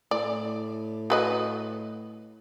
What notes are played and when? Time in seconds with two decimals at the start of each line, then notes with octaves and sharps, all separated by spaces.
0.11 A2 D5
1.10 F#4 B4 D#5